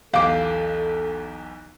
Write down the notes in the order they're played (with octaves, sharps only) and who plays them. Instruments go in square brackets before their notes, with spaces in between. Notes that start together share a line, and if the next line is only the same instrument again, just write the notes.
[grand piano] B1 E2 G4 [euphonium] A4 [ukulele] F5 [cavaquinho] G5 D6